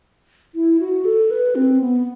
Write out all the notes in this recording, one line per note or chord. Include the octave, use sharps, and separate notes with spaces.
E4
F#4
A4
B4
C4
B3